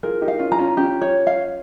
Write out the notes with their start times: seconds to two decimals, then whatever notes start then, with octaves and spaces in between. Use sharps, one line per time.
0.03 F4 G#4 A#4
0.21 D#4 G4
0.28 F5
0.39 C#4 F4
0.52 A#5
0.58 C#4 F4
0.77 C#4 F4 G4
1.01 C#5
1.27 F5